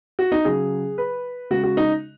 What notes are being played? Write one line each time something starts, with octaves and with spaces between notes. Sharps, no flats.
F#4
D#4
C#3 F#3 G#4
B4
C#3 G#3 F#4
F#4
D#4